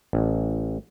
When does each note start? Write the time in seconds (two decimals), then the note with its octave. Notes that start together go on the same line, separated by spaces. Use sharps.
0.13 A1